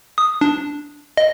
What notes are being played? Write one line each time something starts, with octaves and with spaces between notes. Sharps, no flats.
D#6
D4
D#5